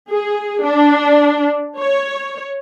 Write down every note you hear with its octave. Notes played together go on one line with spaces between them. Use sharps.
G#4
D4
C#5